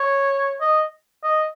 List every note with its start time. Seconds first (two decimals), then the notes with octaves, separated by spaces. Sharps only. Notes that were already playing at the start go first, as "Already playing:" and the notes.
Already playing: C#5
0.61 D#5
1.23 D#5